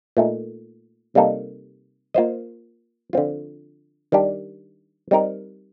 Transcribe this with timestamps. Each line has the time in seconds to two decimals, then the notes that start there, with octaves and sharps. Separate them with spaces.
0.17 A#2 A3 D#4
1.15 C3 G3 A#3 D#4 A4
2.14 A#3 F4 C5 D#5
3.13 D3 F3 C4 F4
4.12 D#3 G3 D4 G4
5.11 G3 C4 D#4 A#4